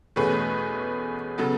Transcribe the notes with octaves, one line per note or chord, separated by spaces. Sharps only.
E2 B2 A3 C#4 G#4 B4
C#3 F#3 B3 A4